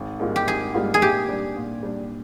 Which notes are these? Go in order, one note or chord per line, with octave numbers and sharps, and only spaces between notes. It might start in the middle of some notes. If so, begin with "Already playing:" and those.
Already playing: G#1
G#2 G3 A#3 F4
G4
G#1 G#4
G#2 G3 A#3 F4
G#4
A#2 G4
G3 D4
A#2
G3 D4